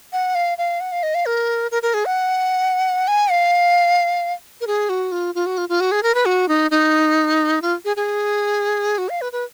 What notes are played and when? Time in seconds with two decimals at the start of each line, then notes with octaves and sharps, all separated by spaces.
0.13 F#5
0.35 F5
0.58 F5
0.80 F#5
0.92 F5
1.03 D#5
1.15 F5
1.26 A#4
1.71 A#4
1.83 A#4
1.94 G#4
2.06 F#5
3.08 G#5
3.31 F5
4.61 A#4
4.67 G#4
4.89 F#4
5.12 F4
5.35 F4
5.46 F#4
5.58 F4
5.69 F4
5.80 F#4
5.92 G#4
6.03 A#4
6.15 B4
6.26 F#4
6.49 D#4
6.71 D#4
7.62 F4
7.85 G#4
7.96 G#4
8.98 F#4
9.09 F5
9.21 B4
9.32 B4